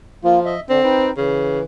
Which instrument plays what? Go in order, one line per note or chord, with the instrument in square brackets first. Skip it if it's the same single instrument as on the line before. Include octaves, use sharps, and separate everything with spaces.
[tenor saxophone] F3 [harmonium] A#3 F4
[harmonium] D#5 E5
[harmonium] D3 D4 [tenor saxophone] C4
[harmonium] D#4 B4 G5
[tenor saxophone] C#3 [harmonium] E3